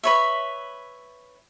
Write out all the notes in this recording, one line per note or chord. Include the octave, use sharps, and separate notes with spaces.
B4 C#5 E5